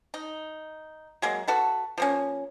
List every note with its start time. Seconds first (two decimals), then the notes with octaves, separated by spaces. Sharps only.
0.14 D#4
1.22 F#3 G#3 A#3
1.48 F#4 A4 B4
1.98 F3 A#3 C#4